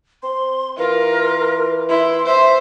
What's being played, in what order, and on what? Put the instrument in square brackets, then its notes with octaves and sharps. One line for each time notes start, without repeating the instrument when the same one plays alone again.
[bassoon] C4 [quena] C6
[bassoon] E3 [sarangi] F4 [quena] A#4
[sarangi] E4 [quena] C6
[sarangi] C5 [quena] E5